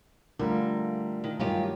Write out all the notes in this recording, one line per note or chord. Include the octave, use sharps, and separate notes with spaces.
D3 G3 A3 F4 A#4
D#3
G2 D#3 F#3 G#3 F4 G4